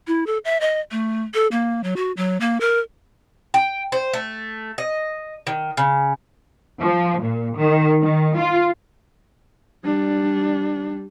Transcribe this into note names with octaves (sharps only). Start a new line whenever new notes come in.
E4
A4
E5
D#5
A3
A4
A#3
F#3
F#4
F#3
A#3
A#4
G5
C5
A3
D#5
D#3
C#3
F3
A#2
D#3
D#3
F4
G3 D4